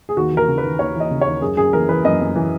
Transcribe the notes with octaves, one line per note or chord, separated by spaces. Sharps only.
G#4
D#2 F#4
E3
A#4
C#3
B4
D#2
D#2 C#5
E3
D#5
C#3
D#2 C#5
F#2 G#4
F#2 G#4
E3 A#4
E3 B4
F#2 D#5
F#2
E3